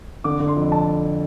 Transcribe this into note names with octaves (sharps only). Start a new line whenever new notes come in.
D3 D6
D3
C6
F2
A5